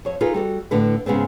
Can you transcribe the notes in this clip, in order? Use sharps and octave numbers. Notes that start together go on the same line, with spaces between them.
F2 C#5
D#4 F4 G#4 A4 B4
G3 F#4 A4
A2 D3 B4
G#2 C#3 G#3 B3 C4